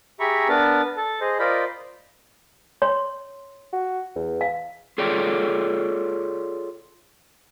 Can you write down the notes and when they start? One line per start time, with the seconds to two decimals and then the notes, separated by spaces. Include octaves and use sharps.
0.20 G4 G#4 E5 A#5 B5 C#6
0.49 B3 D4 A#4 B4 A5
0.97 A4 A5
1.21 G#4 C5 D#5
1.39 F4 A#4 C5 D5 D#5 B5
2.82 C#5 C6
3.73 F#4
4.16 E2
4.41 F5
4.98 F4 G#4 A4 C#5 D5 G5